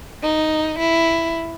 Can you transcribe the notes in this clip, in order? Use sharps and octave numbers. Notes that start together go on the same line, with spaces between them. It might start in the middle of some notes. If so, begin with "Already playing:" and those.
D#4
E4